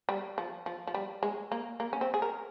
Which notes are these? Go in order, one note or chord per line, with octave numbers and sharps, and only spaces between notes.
G3
F3
F3
F3
G3
G#3
A#3
A#3
C#4
C4
G#4
A#4